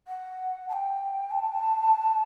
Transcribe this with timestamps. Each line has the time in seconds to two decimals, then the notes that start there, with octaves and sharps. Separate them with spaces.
0.08 F#5
0.69 A5
0.73 G5
1.31 A5